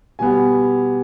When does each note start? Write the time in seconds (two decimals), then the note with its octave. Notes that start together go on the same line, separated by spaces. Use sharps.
0.19 B2 G3 B3 G#5